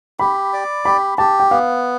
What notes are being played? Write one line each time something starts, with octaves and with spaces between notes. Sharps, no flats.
G4 B5
D5
G4 B5
G4 A5
G5
B3 F5